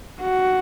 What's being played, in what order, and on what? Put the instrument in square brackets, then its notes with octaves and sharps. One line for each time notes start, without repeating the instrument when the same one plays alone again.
[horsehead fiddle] F#4